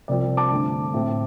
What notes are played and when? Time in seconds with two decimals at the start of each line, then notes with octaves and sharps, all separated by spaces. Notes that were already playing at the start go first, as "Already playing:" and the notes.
0.08 C2 C3 F3 C4 D5
0.37 A5 D6
0.51 G2 D3 A3 C4
0.94 A2 A3 C4